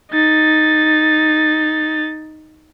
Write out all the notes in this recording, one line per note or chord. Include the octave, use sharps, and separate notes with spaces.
D#4 A6